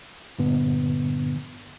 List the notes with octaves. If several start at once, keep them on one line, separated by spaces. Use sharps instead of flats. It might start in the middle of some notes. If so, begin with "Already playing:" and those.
G2 A#2 D3 B3